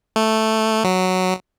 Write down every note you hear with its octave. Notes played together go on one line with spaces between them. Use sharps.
A3
F#3